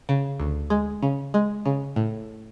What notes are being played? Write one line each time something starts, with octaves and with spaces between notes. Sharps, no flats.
C#3
D2
G#3
C#3
G#3
C#3
A2